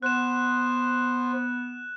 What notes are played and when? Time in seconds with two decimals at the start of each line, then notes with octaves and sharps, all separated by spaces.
0.03 B3 C5 F#6 E7